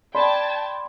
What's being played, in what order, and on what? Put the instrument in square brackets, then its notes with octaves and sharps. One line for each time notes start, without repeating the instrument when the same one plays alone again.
[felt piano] D5 B5 C6 [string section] G5 A5 G#6